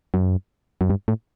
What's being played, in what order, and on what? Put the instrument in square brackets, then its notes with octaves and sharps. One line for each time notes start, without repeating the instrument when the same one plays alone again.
[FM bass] F#2
F#2
G2
A2